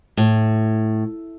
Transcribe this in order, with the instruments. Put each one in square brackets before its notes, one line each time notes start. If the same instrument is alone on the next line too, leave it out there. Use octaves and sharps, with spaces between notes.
[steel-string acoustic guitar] A2